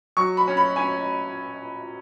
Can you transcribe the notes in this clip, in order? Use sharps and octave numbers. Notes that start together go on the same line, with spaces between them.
F#3 C#6
B5
C#4
B5
C#4 G#5